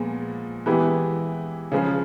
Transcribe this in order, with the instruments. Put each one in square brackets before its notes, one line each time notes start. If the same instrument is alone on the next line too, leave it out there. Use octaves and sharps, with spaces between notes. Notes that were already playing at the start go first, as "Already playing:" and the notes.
Already playing: [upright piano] A#2 F3 G#3 B3
E3 G#3 B3 E4 G4
C#3 F3 G#3